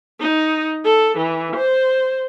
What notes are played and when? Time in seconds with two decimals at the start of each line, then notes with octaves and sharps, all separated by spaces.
0.20 D#4
0.85 A4
1.18 E3
1.56 C5